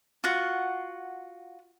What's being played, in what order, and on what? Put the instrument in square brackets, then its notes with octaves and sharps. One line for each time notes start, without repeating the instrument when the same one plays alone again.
[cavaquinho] F4 F#4 F#5